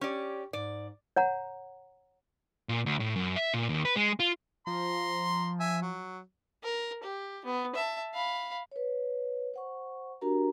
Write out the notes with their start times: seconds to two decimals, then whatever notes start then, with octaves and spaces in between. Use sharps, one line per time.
0.01 C#4 G4 D5
0.53 G#2 D5
1.16 C#5 F#5 A#5
2.69 A#2
2.86 D2
3.00 A2
3.16 F#2
3.36 E5
3.54 A#2
3.69 D#2
3.85 B4
3.96 G#3
4.20 F4
4.67 F3 A#5 C6
5.60 E5 G#5
5.82 F#3
6.64 A#4
7.03 G4
7.45 B3
7.75 E5 A5
8.14 F5 B5
8.72 B4 C#5
9.54 C5 F#5 C#6
10.21 D4 F#4 G4 A#4 A#5